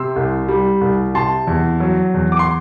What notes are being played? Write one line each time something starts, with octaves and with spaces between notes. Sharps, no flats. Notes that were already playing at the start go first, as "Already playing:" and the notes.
Already playing: C3 C6 E6
C2
G3
C2
C3 A5 C6
E2
F#3
E2
D6
C6